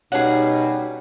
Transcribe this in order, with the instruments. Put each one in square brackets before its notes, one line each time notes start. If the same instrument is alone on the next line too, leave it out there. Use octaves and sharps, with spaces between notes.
[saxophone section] B2 G3 [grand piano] C#4 [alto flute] D#4 [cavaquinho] G#4 F#5